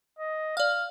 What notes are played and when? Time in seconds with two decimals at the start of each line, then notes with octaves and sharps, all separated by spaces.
0.19 D#5
0.57 D5 F5 F6